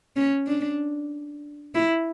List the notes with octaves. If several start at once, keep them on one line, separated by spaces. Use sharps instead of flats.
C#4
D4
E4